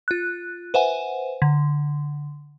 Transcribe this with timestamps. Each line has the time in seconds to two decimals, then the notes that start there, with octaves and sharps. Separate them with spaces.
0.08 F4 F#6
0.74 B4 C5 E5 F#5 G#5
1.42 D3